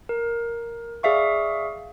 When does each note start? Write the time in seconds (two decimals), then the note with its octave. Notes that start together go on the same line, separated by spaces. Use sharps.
0.09 A#4
1.03 G#4 D5 E5 F5 C#6